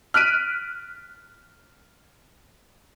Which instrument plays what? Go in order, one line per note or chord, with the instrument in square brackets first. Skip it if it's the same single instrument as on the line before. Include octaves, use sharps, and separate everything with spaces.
[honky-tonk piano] F6 F#6 B6 D7 D#7